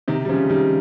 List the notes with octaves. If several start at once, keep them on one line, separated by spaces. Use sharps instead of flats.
C3 D#3
G3
C#3 F3
D#3 G3